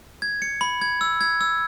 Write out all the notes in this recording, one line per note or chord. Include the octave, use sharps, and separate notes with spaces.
G#6
C#7
B5
G#6
E6
G#6
E6